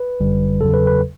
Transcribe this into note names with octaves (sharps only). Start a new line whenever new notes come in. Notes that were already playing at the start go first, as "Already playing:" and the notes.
Already playing: B4
G1 F#2 D3 G3
E2 C#3 F#3 A4
B4
B4